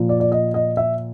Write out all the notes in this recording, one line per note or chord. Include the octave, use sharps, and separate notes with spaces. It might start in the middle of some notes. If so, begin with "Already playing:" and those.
Already playing: A#2 F3
D5
D5
D#5
D#5
E5